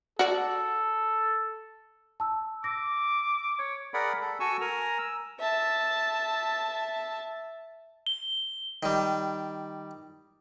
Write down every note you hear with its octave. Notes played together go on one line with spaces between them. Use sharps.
F#4 A4 D5
A5 E6
D6 E6 A#6
C#5
G#4 A#4 D5 F#5 B5
A4
F#4 A4 G#5 C#6 E6
A#4 G#5 A#5
E6
E5 A5
G7
D#3 G3